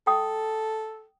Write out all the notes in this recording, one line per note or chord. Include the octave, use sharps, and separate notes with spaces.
A4 G5 D#6